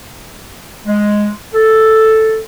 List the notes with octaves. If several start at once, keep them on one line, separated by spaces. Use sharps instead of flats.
G#3
A4